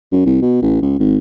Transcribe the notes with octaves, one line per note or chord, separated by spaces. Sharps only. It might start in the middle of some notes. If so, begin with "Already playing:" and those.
F#2
C2
B2
A1
C#2
G#1